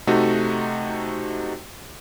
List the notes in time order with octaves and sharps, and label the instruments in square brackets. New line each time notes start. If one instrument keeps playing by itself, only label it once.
[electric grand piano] C3 A3 D#4 F#4